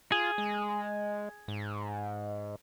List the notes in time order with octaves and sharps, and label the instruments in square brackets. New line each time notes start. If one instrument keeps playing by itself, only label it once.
[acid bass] F4 [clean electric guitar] G#4
[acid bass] G#3
G#2